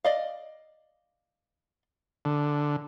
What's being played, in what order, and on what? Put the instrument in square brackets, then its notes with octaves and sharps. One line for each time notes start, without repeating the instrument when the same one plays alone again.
[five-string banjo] D5 D#5 F5
[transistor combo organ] D3